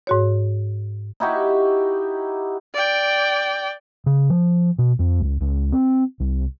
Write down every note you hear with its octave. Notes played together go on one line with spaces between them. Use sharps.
G#2 F#4 C#5
D#4 E4 F#4 G4
D5 G5
C#3
F3
B2
F2
C#2
C#2
C4
C2